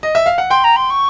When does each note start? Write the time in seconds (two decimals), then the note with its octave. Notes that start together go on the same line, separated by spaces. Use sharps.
0.03 D#5
0.15 E5
0.26 F5
0.38 F#5
0.50 G5 C6
0.64 A#5
0.76 C6
0.90 C#6